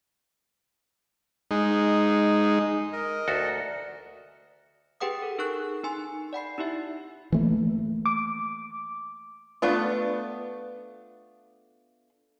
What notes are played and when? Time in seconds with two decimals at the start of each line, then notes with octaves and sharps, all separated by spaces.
1.51 G#3 D#4
2.92 A#4 D#5
3.28 D2 F#4 A4
5.01 G4 G#4 B4 F#5 G5 D#6
5.22 A4
5.38 D#4 G#4 A#4 C#6 F#6
5.83 D#4 G#5 C6
6.33 D5 F#5 B5 C7
6.58 D#4 E4 G4 E5
7.32 E3 A3 A#3
8.06 D6
9.62 A3 B3 D4 F4